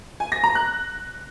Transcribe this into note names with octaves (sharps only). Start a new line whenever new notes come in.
G#5
A#6
A#5
F#6